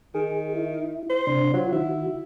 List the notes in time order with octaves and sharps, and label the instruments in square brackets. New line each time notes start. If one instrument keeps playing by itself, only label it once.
[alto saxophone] D#3 [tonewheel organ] G#4
[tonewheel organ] E4
[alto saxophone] C5
[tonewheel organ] C3 D4
[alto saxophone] F#3 [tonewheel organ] F4 C5
[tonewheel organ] D#3 F#4 [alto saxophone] E4